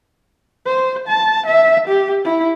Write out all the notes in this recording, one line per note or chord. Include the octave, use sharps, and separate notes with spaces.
C5
A5
E5
G4
E4